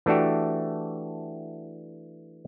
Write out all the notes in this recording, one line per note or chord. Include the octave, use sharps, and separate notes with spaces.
E3 A3 D4 F#4 G4